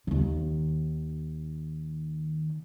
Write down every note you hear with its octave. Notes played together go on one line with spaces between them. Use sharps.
D#2 D#3